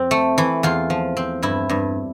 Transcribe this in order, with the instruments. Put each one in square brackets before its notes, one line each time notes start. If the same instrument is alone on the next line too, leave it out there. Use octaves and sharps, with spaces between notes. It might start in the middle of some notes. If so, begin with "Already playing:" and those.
Already playing: [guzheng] F2 C4
A3
E3
E2 F4
F3
C4
G2 E4
G2